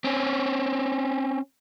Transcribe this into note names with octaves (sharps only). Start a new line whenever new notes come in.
C4 C#4